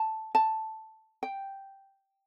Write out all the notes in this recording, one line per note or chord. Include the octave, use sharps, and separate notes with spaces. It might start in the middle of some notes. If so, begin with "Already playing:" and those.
Already playing: A5
A5
G5